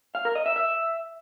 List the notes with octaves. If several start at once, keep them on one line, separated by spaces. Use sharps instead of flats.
F5
A#4
D#5
E5
E5